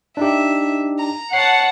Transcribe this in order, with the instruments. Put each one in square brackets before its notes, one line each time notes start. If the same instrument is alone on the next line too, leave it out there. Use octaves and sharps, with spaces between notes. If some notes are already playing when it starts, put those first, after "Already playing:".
[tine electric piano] D4 D#4 G4 [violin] E5
[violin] A#5
[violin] C#5 A5 [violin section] F#5 [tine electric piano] C7